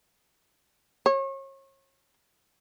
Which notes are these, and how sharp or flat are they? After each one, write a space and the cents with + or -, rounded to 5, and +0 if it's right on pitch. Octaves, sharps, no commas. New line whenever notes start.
C#5 -35